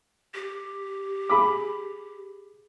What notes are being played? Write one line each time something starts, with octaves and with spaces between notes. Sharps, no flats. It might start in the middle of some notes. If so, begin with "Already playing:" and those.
G4
G#4 B5 D6